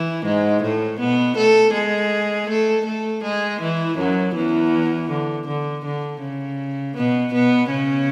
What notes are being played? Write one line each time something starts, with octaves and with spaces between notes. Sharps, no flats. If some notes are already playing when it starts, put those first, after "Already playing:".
Already playing: E3 E4
G#2 G#3
A2 A3
B2 B3
A3 A4
G#3 G#4
A3 A4
A3 A4
G#3 G#4
E3 E4
F#2 F#3
E2 E3
D3
D3
D3
C#3
B2 B3
B2 B3
C#3 C#4